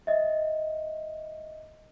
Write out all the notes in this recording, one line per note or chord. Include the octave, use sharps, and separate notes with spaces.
D#5 E5